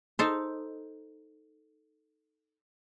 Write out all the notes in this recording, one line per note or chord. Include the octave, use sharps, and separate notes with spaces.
D#4 A4 C5